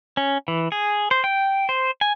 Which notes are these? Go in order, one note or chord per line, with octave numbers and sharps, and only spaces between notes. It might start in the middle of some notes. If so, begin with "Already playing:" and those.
C#4
E3
G#4
C5
G5
C5
G#5